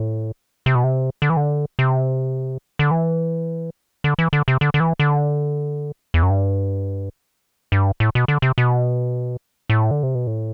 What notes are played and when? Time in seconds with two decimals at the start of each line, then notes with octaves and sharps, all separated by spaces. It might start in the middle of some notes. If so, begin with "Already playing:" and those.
Already playing: A2
0.66 C3
0.75 B2
0.84 C3
1.22 D3
1.30 E3
1.37 D3
1.79 C3
2.79 D3
2.91 E3
4.04 D3
4.19 E3
4.33 D3
4.48 C3
4.61 D3
4.74 D3
4.80 E3
4.99 D3
6.14 E2
6.23 F#2
6.30 G2
7.72 G2
8.00 A2
8.15 B2
8.28 D3
8.42 C3
8.58 B2
9.70 A2
9.91 D3
10.03 C3
10.15 B2
10.27 A2